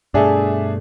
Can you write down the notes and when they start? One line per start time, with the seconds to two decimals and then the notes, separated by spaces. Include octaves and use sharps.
0.14 G2 B2 A3 D4 G#4 E5